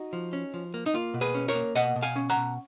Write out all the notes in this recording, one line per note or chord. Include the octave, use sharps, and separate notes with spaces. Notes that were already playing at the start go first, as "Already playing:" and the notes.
Already playing: D#4 F#4
F3
C#4
F3
A#3
D#4
A#3 F4
B2
G#4 B4
C#4
A#4 C#5
A#3
B2 D#5 F#5
B2
F5 G#5
C#4
F#5 A#5
B2